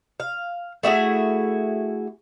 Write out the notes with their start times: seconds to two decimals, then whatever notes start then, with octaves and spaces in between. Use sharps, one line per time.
0.20 F5
0.83 A3 E4 F#4 G#4